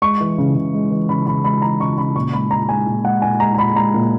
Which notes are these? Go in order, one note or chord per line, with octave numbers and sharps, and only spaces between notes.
G#3 C#6
E3
C#3
C#3
G#3
E3
C#3 B5
C#3 B5
G#3 B5
E3 A#5
C#3 C#6
C#3 B5
A#2 C#6
G#3 B5
A#2 A#5
G#3 G#5
A#2
G#3 F#5
A#2 G#5
G#3 A#5
A#5
A#2 B5
G#3 A#5
A#2